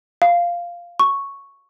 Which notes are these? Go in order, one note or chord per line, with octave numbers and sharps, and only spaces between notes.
F5
C#6